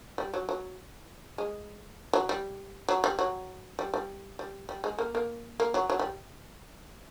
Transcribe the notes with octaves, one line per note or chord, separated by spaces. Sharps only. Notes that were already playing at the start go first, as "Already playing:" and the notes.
G3
F#3
F#3
G#3
F#3
G3
F#3
G3
F#3
G3
G3
G3
G3
G#3
A#3
A#3
A#3
F#3
F#3
G3